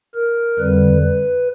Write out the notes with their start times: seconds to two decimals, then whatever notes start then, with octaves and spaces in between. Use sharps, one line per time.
0.15 A#4
0.59 F2 D3 G3 B4
1.02 B4